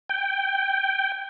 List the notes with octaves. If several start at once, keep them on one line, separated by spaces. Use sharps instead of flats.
G5